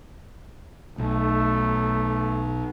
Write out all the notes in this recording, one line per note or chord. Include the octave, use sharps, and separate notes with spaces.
B1 A3